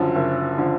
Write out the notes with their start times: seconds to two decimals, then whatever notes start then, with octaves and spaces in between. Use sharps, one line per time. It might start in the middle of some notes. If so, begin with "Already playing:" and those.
Already playing: F#1 F#2 D3 F3
0.15 F#1
0.58 D3 F3